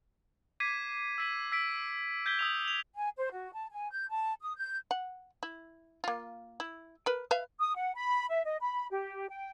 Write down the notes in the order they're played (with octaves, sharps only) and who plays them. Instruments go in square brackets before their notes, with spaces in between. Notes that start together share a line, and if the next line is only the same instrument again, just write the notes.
[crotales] D6 G#6 B6 C7 D#7
E6 B6 D#7
E6 B6 D7
G6 G#6 B6 G7
D#6 E6 F7
F7
[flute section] G#5
C5
F#4
A5
G#5
G6
A5
D#6
G6
[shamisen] F#5
E4
A#3 F4
E4
A#4 B4
B4 E5 F5
[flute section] D#6
F#5
B5
E5
D#5
B5
G4
G5